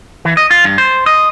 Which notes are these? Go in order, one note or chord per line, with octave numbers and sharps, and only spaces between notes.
E3
D#5
F4
G2
C5
D#5